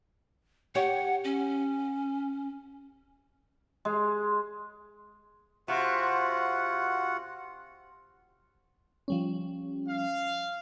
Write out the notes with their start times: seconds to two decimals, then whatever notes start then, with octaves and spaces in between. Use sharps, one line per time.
0.75 G4 C#5 F#5
1.24 C#4
3.85 G#3
5.68 C3 F4 F#4 F#5
9.08 F3 G3 C#4
9.89 F5